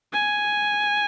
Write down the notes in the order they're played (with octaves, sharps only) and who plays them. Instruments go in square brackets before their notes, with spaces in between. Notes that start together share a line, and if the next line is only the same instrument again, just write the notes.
[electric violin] G#5